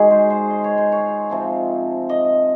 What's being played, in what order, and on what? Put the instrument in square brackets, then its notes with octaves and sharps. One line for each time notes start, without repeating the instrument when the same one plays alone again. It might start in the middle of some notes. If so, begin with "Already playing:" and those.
Already playing: [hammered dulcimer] D#3 G#3 D#4 F#4 G#4
C5
C5
D#5
C#5
C5
C#5
C3 F3 C4
D#5